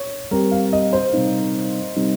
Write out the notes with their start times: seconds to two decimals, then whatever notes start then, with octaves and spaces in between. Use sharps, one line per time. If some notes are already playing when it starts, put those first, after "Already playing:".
Already playing: C#5
0.31 G3 C4 G4 A#4
0.52 F5
0.73 D#5
0.93 C5
1.13 C3 G3 C4 D#4
1.96 C3 G3 C4 D#4